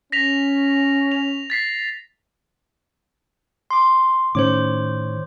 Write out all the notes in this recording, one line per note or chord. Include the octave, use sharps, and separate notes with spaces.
C#4 A#6 B6 F7
F7
A6 B6 C7
C6 D6
A2 D#3 C#4 C5 C#5 D6